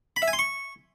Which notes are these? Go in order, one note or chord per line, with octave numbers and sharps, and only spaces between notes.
B5
E5
G#5
C6
C#6